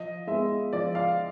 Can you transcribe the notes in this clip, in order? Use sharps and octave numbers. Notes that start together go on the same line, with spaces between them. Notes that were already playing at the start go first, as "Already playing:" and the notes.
Already playing: F3 D#5
G#3 B3 E5
F3 D5
F5